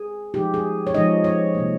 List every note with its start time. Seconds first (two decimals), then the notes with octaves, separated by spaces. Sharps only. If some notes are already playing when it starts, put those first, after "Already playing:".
Already playing: G#4
0.34 F3 G#3 D#4 G4
0.54 G#4
0.87 C#5
0.94 F3 G#3 D#4 D#5
1.24 C#5
1.55 C3 G3 A#3